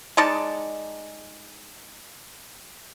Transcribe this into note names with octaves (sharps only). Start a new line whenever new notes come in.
G#3 D#4 D5 A5